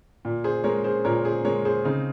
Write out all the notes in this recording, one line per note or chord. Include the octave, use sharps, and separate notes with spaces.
A#2
G#4 C5
G#3 A#4 C#5
G#4 C5
A#2 A#4 C#5
G#4 C5
G#3 A#4 C#5
G#4 C5
C#3 C4 D#4